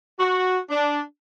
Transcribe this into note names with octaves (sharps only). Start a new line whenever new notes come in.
F#4
D4